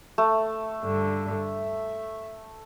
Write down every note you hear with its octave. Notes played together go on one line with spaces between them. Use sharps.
A3
G2 D3
E5